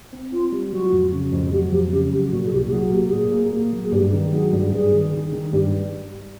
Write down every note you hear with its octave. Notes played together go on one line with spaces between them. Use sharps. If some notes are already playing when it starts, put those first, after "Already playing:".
C4
C4 F4
G3
F#3 F#4
F2
C#3
F2
F#3 G4
F2 G4
C#3 G4
F#3 G4
A#2 F#4
G#4
C2 G4
G4
F#3 G#4
A#3 G4
G4
A#2 G#4
A#3
A#3
F#3
G#4
G2 G4
D#3
F#3 G#4
G2
G2 G#4
D#3
D#3
D#3
G2 G4